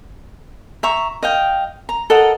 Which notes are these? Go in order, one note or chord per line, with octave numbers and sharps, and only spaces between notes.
E5 A#5 C#6
D#5 F5 G5
A#5
A4 A#4 D#5 F#5